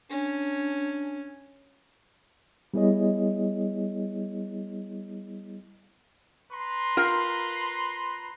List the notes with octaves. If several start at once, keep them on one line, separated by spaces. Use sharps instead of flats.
C#4 D4
G3 B3 E4 G#4 C#5 D#5
B4 A#5 C6
F4 A#4 G5